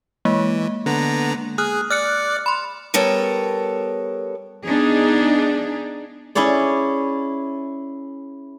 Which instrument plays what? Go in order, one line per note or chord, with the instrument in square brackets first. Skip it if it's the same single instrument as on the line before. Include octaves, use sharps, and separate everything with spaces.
[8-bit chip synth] E3 [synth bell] G#3 A#3
[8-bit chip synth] D3 B3 A#5
[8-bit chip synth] G#4 [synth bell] D#6 F6 F#6
[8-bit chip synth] D5 [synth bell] F6 F#6 C#7
[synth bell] B5 C6
[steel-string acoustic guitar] G3 B3 A4 A#4 C#5
[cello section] B3 D4 D#4 G#4
[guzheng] C#4 E4 G#4 C#5 D5